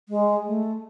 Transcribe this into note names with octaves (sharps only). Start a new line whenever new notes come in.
G#3
A3